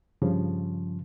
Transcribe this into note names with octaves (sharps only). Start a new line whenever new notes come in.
G2 C#3 F3